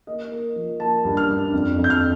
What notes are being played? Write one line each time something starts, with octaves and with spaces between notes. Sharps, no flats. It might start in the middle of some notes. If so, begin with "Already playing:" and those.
A#3 D#5
A#3
F3
A#3 A5
G2
F6
D4
F2
F2
G6
F6